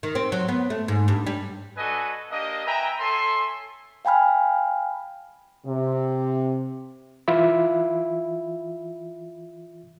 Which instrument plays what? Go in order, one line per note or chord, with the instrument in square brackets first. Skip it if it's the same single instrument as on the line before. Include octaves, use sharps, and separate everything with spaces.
[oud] D#3
C4
F#3
B3
A3
G#2
G2
G3
[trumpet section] D4 F#4 A4 B4 D#5 G#5
A#3 D4 G4 D#5
B4 E5 G5 G#5 A#5
A4 C#5 E5 G#5 C6
[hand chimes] F5 G5 G#5 B5 F6
[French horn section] C3
[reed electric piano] E3 F4 E5 B5